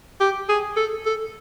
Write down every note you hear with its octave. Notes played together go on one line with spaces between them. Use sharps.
G4
G#4
A4
A4